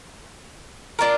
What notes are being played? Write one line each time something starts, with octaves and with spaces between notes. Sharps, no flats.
D4 F4 A#4